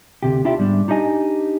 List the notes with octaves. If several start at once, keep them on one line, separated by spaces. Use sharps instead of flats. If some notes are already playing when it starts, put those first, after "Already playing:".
D2 C3 G4
D4 E4 F4 G4 D5 E5
G#2 G3 B3 D4
D4 D#4 G4 D#5 G#5